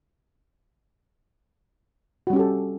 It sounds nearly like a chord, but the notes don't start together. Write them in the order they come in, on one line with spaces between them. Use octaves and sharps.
F#4 G3 C#4 G4 A4